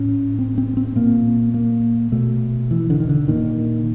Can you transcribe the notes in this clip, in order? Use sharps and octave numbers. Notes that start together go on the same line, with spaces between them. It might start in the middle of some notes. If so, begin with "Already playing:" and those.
Already playing: A2 C#4
C4
C4
C4
A#2 A#3
A#3
B2 A3
E3
D3
D#3
D3
A#2 D#3